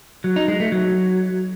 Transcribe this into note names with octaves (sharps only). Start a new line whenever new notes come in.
F#3
D#4
G#3
A3
F#3